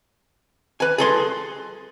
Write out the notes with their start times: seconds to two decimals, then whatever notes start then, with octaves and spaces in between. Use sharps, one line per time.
0.80 B4 G#5
0.98 G#4 A4 C6